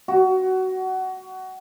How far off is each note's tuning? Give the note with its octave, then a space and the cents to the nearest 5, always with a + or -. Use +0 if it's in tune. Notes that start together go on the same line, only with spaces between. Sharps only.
F#4 +20